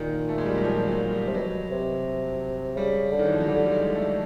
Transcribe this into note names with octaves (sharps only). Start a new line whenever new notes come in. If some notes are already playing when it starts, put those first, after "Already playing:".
Already playing: A#2 D#3
A3
G#3
G3
F#3
F3
F#3
G3
C3
B2 F#3
C3
C#3 G3
D3
D#3
E3
F3
F#3
D3 G3
G3
G#3
A3